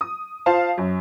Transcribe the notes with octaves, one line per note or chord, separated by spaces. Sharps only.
D#6
F4 C5 F5 A5
F#2